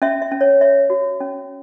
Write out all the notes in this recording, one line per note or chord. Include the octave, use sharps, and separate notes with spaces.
C#4 E5
E5
C#4
C#5
C#5 E5
F#4
C#4